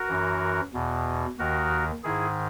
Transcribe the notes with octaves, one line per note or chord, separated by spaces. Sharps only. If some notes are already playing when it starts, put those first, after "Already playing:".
Already playing: F#4 A#4
F#2 E3
E2 B2
D#2 D#3 F#4 A#4
G#2 D#3 E4 G#4